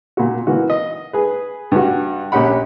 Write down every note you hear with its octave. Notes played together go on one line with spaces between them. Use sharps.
A#2 F#4
E3 A#3 F#4
D#5
G#4 B4
G2 F#4
A#1 C#4 G4 F#5 B5